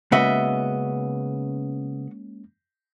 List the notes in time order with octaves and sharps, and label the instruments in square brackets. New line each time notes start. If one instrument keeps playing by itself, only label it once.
[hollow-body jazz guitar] C#3 B3 [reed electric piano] G#3 A#3 C#4 [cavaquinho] F#4 D#5 E5